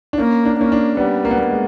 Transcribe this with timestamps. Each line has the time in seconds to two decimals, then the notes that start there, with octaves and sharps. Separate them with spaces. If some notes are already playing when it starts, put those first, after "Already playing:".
0.13 D4
0.18 A#3 C#4
0.45 D4
0.58 A#3 C#4
0.72 D4
0.97 G3 B3
1.25 A#3
1.31 B3
1.39 A#3
1.51 G#3